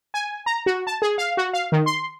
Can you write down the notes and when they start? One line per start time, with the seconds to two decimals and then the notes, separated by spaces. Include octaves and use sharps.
0.14 G#5
0.46 A#5
0.66 F#4
0.87 A5
1.02 G#4
1.18 F5
1.37 F#4
1.53 F5
1.72 D#3
1.86 C6